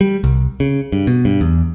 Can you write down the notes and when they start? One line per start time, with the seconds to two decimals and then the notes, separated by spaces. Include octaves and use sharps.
0.01 G3
0.24 C2
0.60 C#3
0.92 G2
1.07 B2
1.25 G2
1.41 E2